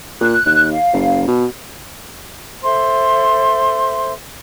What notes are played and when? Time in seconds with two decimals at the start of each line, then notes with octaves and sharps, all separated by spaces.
0.21 A#2 F#6
0.46 D#2
0.73 F5
0.93 F#1
1.27 B2
2.63 A4 C5 E5 C6